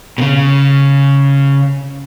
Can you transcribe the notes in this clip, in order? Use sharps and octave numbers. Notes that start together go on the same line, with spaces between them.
B2
C#3